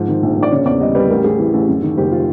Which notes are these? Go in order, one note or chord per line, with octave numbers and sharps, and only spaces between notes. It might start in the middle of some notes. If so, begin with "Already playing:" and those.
Already playing: G#2 F3
D#3
A#1
A#1
D5
C#3 C#5
E2 D5
G3 D#5
G3 B4
A1 A#4
A1 G#4
E3 G#4
A1
F#2
D#3
F#1 G4
F4